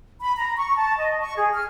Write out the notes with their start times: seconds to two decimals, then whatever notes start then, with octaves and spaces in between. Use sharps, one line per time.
0.21 B5
0.38 A#5
0.57 C#6
0.77 A5
0.99 D#5
1.20 C#6
1.37 G#4
1.53 F6